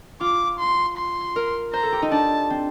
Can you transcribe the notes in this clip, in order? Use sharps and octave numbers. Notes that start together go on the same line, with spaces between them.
F4 D6
C6
C6
A#4
C5 A#5
A4
G4
D#4
D4 A5
C4